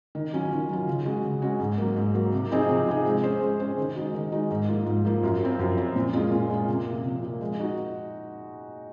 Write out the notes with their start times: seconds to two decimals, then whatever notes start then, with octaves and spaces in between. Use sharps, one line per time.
0.15 D#3
0.33 F#3 C#4 F4
0.51 D#3
0.69 F#3 C#4 F4
0.87 C#3
1.05 G#3 C#4 F#4
1.24 C#3
1.42 G#3 C#4 F#4
1.60 G#2
1.78 F#3 A#3
1.96 G#2
2.14 F#3 A#3
2.32 C3
2.51 F3 C4 D#4 G#4
2.69 C3
2.87 F3 C4 D#4 G#4
3.05 G#3
3.23 C#4 G#4 C5
3.41 G#3
3.60 C#4 G#4 C5
3.78 D#3
3.95 G#3 D#4 F#4
4.14 D#3
4.32 G#3 D#4 F#4
4.51 G#2
4.68 F3 A#3 F4
4.86 G#2
5.05 F3 A#3 F4
5.23 F#2
5.41 F3 C4
5.59 F#2
5.77 F3 C4
5.96 A#2
6.13 G#3 C#4 F4
6.32 A#2
6.50 G#3 C#4 F4
6.68 C3
6.86 F3 A#3
7.04 C3
7.23 F3 A#3
7.41 G#3
7.59 D#4 F#4